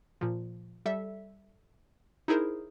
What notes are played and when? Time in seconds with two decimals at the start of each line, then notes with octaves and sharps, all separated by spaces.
0.21 A#2 F3
0.86 G3 A4 E5
2.28 D#4 E4 G#4 A#4 C5